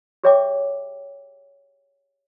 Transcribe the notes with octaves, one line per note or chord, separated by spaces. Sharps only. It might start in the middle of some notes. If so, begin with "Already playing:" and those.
G4 G#4 C#5 E5 G5 D6